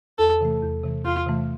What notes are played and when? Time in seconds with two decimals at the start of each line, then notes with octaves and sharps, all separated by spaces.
0.18 E2 A4
0.41 C3 E3 A3
0.63 E2
0.84 C3 E3 A3
1.05 E2 F4
1.26 C3 E3 A3